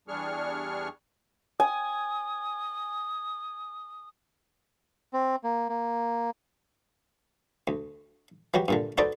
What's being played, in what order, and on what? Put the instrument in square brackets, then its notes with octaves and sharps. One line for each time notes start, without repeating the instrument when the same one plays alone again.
[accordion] E2 G3 D4 G#4 C#6 F6
[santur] G#5 [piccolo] D#6
[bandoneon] C4
A#3
A#3
[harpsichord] D2
E3 F#3 F#4 G4
G2 A#2 D3
D#4 F#4 A4 B4 C5 D5